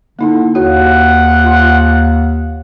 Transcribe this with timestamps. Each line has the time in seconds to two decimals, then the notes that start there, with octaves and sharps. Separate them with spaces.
0.19 D3 A#3 D#4 E4
0.55 D#2 F#4 C#5 F#5
1.44 F4 C6